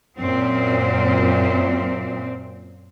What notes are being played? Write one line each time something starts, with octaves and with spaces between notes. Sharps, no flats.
F#2 A#2 C4